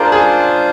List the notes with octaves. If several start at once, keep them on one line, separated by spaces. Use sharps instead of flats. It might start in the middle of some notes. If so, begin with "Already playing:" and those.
Already playing: D4 F4 G#4 A#4 C5
G#4